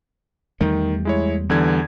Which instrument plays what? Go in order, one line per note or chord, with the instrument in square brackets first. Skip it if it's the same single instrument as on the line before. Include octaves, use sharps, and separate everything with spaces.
[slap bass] E2 G3 A3 [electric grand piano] D#3
[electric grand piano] G#3 E4 C#5
[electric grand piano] E2 D3 G#6 [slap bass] E3 G3